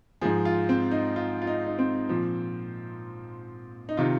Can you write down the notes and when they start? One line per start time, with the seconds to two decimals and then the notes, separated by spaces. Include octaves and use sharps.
0.22 G#2 F3 G#4
0.45 F4
0.69 C4
0.91 D#4
1.16 F4
1.42 F4
1.47 D#4
1.66 D#4
1.79 C4
2.09 A#2 F3
3.89 D#4
3.97 C3 D#3 F4